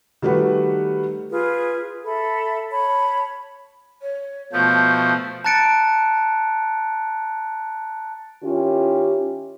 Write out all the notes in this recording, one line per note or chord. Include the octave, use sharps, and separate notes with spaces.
D#3 G3 A3 F#4 B4
F4 G#4 B4
A4 E5 B5
C#5 A5 B5
C#5
B2 F3 A3 G6
A5 A#5 F#6 A6 C#7 D7
D#3 C#4 E4 F4 G4